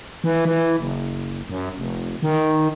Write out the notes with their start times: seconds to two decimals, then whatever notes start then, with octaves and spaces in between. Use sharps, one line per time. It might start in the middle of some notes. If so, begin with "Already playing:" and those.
0.24 E3
0.45 E3
0.78 F#1
1.50 F#2
1.77 F1
2.22 D#3